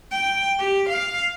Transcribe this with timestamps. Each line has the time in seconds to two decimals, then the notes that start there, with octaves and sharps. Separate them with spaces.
0.12 G5
0.59 G4
0.89 F5